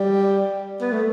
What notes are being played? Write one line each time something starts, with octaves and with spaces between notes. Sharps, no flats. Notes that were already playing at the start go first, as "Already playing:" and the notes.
Already playing: G3
B3
A3